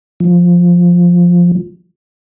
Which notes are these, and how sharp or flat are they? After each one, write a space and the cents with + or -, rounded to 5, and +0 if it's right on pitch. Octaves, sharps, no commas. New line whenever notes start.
F3 +5